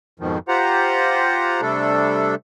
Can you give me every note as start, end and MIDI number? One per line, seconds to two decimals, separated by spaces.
0.20 0.38 41
0.20 0.38 44
0.20 0.38 47
0.20 0.38 51
0.20 0.38 53
0.48 1.61 65
0.48 1.61 67
0.48 1.61 72
0.48 1.61 78
0.48 1.61 82
1.61 2.35 48
1.61 2.35 55
1.61 2.35 57
1.61 2.35 62
1.61 2.35 69